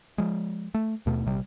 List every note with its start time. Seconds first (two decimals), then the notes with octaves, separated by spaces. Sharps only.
0.18 F3 G#3
0.74 A3
1.06 D#2 B2 A3
1.26 A#1 C3 G3